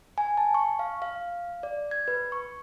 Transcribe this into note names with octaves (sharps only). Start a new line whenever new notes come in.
G#5
A5
C#6
F5
F5
D5
G#6
B4
C#6